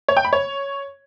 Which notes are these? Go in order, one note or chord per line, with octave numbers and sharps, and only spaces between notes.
C#5
G5
B5
C#5